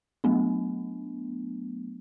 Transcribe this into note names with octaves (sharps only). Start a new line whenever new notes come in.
F#3 A3 B3 D4